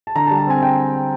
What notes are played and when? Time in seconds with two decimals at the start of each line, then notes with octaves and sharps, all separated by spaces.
0.07 A5
0.15 D3 A#5
0.27 A5
0.31 G3
0.38 A5
0.47 C4 G#5
0.62 G5